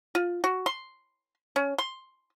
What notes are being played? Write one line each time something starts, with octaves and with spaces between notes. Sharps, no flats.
F4
F#4
C6
C#4
C6